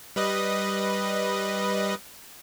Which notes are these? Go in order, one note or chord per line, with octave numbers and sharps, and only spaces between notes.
G3 B4 D#5